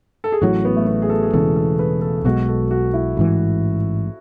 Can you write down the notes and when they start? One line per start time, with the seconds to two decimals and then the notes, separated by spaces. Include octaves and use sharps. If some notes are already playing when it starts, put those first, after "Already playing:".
0.24 A4
0.32 G#4
0.41 A1 A2 F#3 F#4
0.65 B3
0.76 A3
0.87 B3
1.02 G#4
1.10 A4
1.23 G#4
1.33 E1 E2 C#3 A4
1.56 A4
1.79 B4
2.01 A4
2.24 B1 B2 G#3 F#4
2.48 A4
2.71 F#4
2.94 E4
3.17 A1 G#2 E3